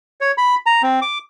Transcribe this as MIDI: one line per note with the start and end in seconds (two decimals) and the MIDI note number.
0.21 0.32 73
0.38 0.55 83
0.66 0.82 82
0.83 1.00 60
1.02 1.18 86